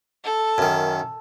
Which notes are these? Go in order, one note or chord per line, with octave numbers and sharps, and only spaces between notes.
A4
F#2 D#3